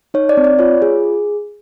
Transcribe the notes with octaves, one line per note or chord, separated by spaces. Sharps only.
D#4 C#5
D5
C4
D5
F4 C#5
G#4